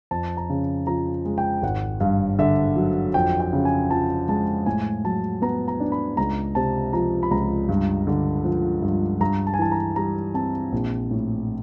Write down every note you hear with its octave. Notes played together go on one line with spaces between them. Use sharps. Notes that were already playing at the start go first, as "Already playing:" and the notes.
F2 A5
A#5
C#3
F3 A#5
G#3
G5
G#1 F#5
G2 F5
D3 E5
F#3
F2 G5
G5
C#3
G#5
F3 A5
G#3 A5
A2 G#5
F#3 A5
B3 A#5
A#5
D4
B5
C#2 A#5
C3 A5
F3 A#5
B5
C#2 A#5
G2
D3
F3
G2
G2 A#5
A5
G#5
E3 A5
A#5
G3 A#5
C4 A5
A#1
A2